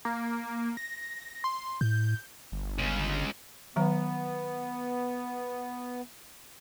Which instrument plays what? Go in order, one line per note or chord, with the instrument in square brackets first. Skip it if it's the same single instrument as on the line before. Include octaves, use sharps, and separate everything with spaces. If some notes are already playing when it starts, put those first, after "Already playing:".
[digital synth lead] A#3
A#6
C6
[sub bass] A2 [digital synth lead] G6
[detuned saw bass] G1
[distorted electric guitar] C#2 C#3
[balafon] D#3 F#3 A#5 [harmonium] B3